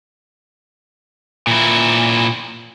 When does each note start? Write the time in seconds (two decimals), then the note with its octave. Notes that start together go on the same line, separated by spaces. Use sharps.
1.47 A#2 E4